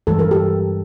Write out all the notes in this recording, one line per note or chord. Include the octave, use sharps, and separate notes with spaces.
G2 E3 G#3 A4
A#4
G4 A4